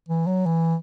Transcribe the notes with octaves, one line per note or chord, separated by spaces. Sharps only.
E3
F#3
E3